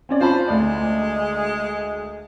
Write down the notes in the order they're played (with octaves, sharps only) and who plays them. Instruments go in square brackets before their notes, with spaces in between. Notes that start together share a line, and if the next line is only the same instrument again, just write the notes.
[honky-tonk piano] C4 C#4 D5
[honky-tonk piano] F4 A5 B5 [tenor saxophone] C5
[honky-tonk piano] D2 D5 [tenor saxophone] G#3